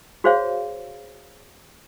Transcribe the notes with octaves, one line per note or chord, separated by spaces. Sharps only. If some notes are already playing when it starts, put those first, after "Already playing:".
F#4 G#4 C5 C#5 F5